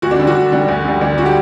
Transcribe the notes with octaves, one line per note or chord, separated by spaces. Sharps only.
D2 F#4
D4
D3 G3
F#4
D2
D3 G3
D2
D3 G3
D2 D4
D3 G3 F#4 G4